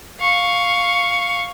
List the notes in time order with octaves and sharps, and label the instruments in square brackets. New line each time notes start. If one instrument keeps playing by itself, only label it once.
[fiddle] F5 C#6